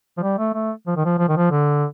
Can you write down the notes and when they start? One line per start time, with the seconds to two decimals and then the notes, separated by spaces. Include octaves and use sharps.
0.17 F3
0.22 G3
0.38 A3
0.54 A3
0.87 F3
0.97 D#3
1.05 F3
1.18 F3
1.28 D#3
1.37 F3
1.51 D3